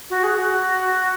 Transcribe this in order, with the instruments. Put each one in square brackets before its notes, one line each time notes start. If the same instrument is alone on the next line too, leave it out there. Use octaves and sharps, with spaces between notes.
[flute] F#4
G#4
F#4